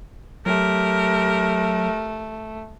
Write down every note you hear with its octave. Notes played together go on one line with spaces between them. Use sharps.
F#3 A3 G4 A#4